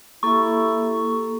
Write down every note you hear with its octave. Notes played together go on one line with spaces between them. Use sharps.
A#3 E4 G4 A4 C#6